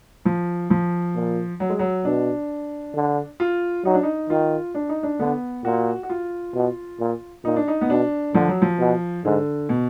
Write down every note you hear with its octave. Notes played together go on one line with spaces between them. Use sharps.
F3
F3
A#2
F#3
G#3
F#3
B2 D4
D3
F4
F#3 D#4
D4
D#4
D#3 F4
D4
D#4
D4
D3 B3
A#2 F#4
F#4
F4
B2
A#2
A#2 D#4
D4
D#4
B3
B2 D4
D3 F3
F#3
F3
B2
G#2 D3
B2